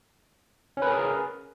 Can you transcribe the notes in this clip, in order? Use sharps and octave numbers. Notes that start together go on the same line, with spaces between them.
C#4 G#4 A#4 B4